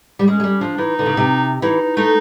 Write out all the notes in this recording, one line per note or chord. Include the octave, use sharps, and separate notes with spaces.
G3
G#3 C#4
G#3
G3
F3 D4
E3 D#4
D3
C#3
C3
E3 D#4
A3 D#4